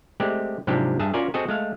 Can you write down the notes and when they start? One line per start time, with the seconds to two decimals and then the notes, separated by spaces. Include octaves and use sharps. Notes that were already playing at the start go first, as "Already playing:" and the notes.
0.20 G#3 A3 C4 G4 D5
0.67 G#2 C3 F3 F#3 D4 G4
0.99 G2 G#4 E5 A5
1.14 C#4 F4 F#4 A#4 D5 G#5
1.34 C4 F#4 G#4 A4 D#5 A5
1.48 G#3 A3 F5